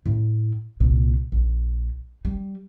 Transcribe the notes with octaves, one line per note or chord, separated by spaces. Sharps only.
A2 E4
C2 A#2
A#1
G3